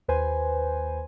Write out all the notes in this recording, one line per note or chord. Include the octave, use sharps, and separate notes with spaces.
D#2 B4 C5 G#5